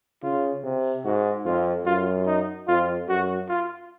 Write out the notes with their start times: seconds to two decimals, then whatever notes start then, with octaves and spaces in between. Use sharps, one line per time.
0.23 C#3 F4
0.63 C3
1.04 G#2 F#4
1.45 F2 F4
1.85 F#2 F4
2.27 D#4
2.68 F2 F4
3.08 F#2 F#4
3.49 F4